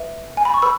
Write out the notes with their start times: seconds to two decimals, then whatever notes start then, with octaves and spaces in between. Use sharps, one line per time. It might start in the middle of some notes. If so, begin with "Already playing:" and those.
Already playing: B4 E5
0.37 G#5
0.45 B5
0.54 C#6
0.62 B4 B5 E6